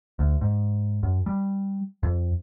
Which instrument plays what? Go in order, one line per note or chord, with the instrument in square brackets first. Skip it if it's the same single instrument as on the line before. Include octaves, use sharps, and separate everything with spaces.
[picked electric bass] D2
G#2
F#2
G3
F2